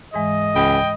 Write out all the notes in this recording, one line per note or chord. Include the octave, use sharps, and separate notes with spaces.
G#2 E3 G#3 D#5
C#2 G5 B5 D#6